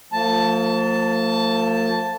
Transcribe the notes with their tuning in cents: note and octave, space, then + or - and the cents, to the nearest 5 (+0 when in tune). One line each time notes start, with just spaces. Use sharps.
F3 +25 A#3 -45 A5 +5